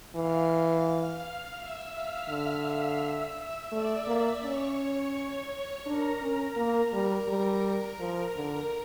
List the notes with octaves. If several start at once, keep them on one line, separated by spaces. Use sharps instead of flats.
E3 F5 F6
E5 E6
F5 F6
D3 E5 E6
A3 D5 D6
A#3 D5 D6
C#4 C#5 C#6
D4 A#4 A#5
C#4
A#3
G3
G3 A#4 A#5
F3
D3